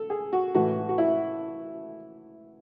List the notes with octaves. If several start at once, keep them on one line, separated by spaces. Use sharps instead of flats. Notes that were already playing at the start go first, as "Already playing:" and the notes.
Already playing: A4
G#4
F#4
A2 E3 A3 F#4
F#4
E4